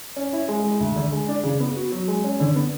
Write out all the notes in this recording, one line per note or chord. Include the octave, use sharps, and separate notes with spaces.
C#4
E4
G#3
G#3
D2
D3
G#3
D4
C#3
B3
F#4
F#3
G#3
C#4
D3
B3